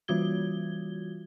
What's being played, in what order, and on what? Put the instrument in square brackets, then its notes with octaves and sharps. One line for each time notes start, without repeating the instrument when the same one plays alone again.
[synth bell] E3 G3 F4 F#4 G#6 G7